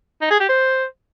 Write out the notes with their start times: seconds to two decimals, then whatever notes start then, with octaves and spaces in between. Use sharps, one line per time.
0.21 D#4
0.30 G#4
0.40 G4
0.49 C5